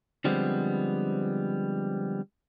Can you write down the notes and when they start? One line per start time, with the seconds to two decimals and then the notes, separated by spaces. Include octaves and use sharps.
0.24 D3 F3 G3 G#3 B3 C4